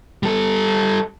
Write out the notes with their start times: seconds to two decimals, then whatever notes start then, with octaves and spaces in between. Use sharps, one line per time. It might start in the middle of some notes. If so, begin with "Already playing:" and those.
0.23 G3 A4